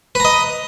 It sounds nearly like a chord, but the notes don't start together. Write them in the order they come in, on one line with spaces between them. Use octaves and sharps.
B4 A#5 D#5